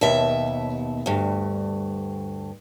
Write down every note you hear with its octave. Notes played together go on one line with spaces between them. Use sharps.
D#2 B2 E5
D2 G2